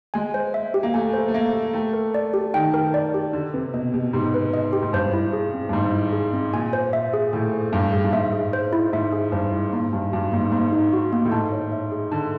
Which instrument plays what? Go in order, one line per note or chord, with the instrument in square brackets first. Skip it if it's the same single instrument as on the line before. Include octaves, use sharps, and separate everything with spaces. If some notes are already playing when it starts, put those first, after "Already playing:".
[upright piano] G#3 [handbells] G#5
[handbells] C5
E5
G4
[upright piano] A#3
[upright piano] A3 [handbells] G#5
[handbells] C5
[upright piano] A3
[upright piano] A#3 [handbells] E5
[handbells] G4
[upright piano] A3 [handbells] G5
[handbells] A#4
D5
G4
[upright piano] D#3 [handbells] G5
[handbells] A#4
D5
G4
[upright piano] D3 [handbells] G4
[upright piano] C3 [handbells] B4
[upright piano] B2 [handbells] D#5
[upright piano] B2 [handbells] G4
[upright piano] G#2 [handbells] G4
[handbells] B4
D#5
G4
[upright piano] G#2
[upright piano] G2 [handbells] C5
[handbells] E4
G#4
C4
[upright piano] G2
[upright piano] G#2 [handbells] C5
[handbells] E4
G#4
C4
[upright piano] A#2 [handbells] G#5
[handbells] C5
E5
G#4
[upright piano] A2 [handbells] G#5
[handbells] C5
[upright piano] G2 [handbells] E5
[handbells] G#4
[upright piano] G2
[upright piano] G#2 [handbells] E5
[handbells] G#4
C5
E4
[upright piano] G#2 [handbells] E5
[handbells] G#4
[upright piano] G2 [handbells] C5
[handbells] E4
[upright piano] G#2 [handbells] A#3
[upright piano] G2 [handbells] D#4
[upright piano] G2 [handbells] F#4
[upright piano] G#2 [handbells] A#3
[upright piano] G#2 [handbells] A#3
[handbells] D#4
F#4
A#3
[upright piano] A2
[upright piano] G#2 [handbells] A5
[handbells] C#5
E5
G#4
[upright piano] D3 [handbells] A5